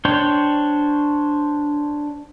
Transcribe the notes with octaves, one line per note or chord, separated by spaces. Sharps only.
D4 C5 C#5 G5